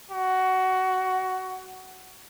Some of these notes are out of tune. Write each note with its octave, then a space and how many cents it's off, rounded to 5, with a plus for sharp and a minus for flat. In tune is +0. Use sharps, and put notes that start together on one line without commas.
F#4 +15